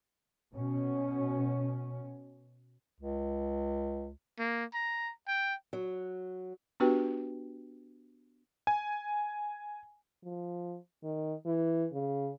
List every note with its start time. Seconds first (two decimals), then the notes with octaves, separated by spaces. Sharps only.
0.54 B2 C#4
3.00 C#2
4.39 A#3
4.74 A#5
5.27 G5
5.73 F#3
6.80 B3 D4 F#4 G4 B4 G5
8.67 G#5
10.24 F3
11.03 D#3
11.46 E3
11.93 C#3